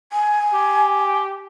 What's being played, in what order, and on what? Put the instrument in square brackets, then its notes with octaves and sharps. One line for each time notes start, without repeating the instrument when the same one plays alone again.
[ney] G#5
[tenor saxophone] G4